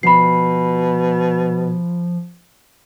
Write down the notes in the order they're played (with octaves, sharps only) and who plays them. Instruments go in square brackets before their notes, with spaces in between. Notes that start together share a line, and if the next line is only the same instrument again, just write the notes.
[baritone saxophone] B2 [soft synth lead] F3 [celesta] B5 C7